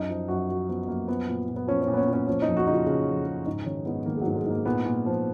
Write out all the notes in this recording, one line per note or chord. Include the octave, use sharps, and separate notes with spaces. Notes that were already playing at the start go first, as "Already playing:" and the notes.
Already playing: F#2 D#4
F3
F#2 F#4
F3 F#4
F3 B3
F#2 A#3
F3 B3
A#2
A#2
B3
F3 C#4
A#2 C#4
B3
C#4
A#2
C#4
F3 C#4
D#4
F2
F#4
C#3 D#4
F4
C#3
F2
C#3
G#2 D#4
D#3 C#4
G#2 B3
D#3 A#3
G#3
F#3
G#2
G#3
G#2 A#3
A#2 B3
A#2
F3